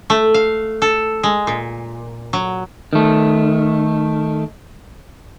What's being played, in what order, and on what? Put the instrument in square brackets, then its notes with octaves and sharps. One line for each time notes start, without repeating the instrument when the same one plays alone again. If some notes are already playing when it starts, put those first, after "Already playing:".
[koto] A3
F5
A4
G#3
A#2
F#3
[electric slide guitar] D#3 A3